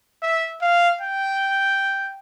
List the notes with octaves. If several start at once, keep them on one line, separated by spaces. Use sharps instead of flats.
E5
F5
G5